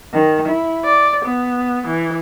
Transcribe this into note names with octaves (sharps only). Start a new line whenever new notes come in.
D#3
E4
D5
B3
E3